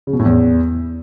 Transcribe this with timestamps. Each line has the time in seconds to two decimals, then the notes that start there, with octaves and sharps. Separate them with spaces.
0.07 C#3
0.13 B2
0.19 A2
0.26 E2